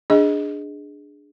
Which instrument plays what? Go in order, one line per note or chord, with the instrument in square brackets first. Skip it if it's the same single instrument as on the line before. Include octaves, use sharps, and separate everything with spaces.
[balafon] D4 G#4 D#5